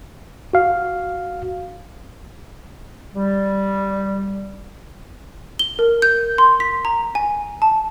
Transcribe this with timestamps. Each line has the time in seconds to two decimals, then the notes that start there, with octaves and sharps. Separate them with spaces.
0.53 F#4 F5
3.14 G3
5.59 G7
5.79 A#4
6.02 G6
6.38 C6
6.60 B6
6.85 A#5
7.15 G#5
7.62 A5